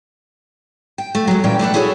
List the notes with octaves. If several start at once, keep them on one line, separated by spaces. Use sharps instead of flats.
G5
A3
F#3 G#3
A#2 E3 C#4 G5
A3 D4 B4 F#5
E4 F#4 G#4 A4 C#5